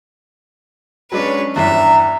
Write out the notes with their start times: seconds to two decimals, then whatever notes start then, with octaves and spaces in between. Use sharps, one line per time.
1.12 F#3 G#3 C#4 D4 B4
1.56 E2 G2 E5 A#5